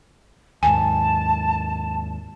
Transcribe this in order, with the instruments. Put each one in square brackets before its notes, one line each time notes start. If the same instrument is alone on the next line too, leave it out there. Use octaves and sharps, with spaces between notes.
[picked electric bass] D#2 G#2 [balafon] G#5 [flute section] A5